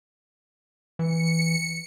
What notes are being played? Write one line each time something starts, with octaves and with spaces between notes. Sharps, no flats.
E3 C#7